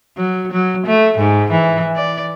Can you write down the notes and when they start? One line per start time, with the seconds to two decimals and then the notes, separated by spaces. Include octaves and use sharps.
0.17 F#3
0.52 F#3
0.87 A3
1.18 G#2
1.51 E3
1.96 D5